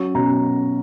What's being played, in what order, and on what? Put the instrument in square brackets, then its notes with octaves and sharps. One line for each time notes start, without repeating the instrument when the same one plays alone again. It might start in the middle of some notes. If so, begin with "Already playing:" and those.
Already playing: [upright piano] F#3 C#4 C#6
B2 F#3 C#4 A#5